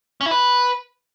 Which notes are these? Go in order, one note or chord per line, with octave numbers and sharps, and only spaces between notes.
C#4
E4
B4